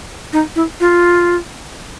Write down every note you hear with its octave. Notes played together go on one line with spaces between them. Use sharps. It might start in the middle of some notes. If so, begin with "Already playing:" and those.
D#4
E4
F4